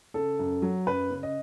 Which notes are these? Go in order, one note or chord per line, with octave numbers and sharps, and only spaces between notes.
C#3 A4
F#2
F#3
F#2 B4
C#3
D#5